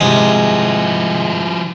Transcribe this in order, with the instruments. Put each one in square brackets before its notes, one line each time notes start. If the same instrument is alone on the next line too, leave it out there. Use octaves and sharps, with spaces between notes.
[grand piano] G#2 C3 [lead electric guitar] F3 E4 [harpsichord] G#3